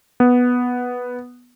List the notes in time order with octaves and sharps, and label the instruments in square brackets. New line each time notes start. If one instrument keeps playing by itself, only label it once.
[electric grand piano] B3